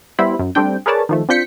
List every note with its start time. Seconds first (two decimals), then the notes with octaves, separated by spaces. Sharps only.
0.19 G3 B3 E4 C5 B5
0.39 F#2
0.55 G3 A3 C4 D4 G5
0.86 G#4 A#4 B4 C#5 D5 A5
1.09 D#3 F3 A3
1.29 C4 D4 F4 G6 B6 C#7